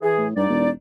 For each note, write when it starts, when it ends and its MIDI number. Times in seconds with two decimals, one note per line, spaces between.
0.02 0.26 52
0.02 0.26 68
0.18 0.33 45
0.36 0.68 37
0.36 0.45 43
0.36 0.68 63
0.36 0.68 74
0.49 0.71 28